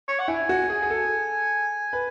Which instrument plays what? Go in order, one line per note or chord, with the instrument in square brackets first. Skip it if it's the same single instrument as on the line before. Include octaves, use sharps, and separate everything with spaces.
[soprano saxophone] C#5
F#5
[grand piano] E4 [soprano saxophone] G#5
[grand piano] F#4
G#4
G#4
A4
B4